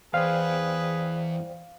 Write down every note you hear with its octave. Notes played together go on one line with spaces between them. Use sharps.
E2 G#4 B4 C5 D5 F5 G5